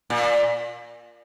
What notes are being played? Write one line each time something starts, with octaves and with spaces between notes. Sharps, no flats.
A#2